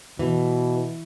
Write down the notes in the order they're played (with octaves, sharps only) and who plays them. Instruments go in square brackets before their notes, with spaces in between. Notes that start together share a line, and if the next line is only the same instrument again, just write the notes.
[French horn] B2 [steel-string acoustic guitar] E3